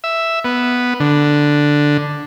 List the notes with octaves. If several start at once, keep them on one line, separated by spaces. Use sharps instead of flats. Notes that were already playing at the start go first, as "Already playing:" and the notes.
E5
B3
D3